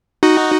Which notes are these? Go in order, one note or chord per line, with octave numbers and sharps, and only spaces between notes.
D#4 F#4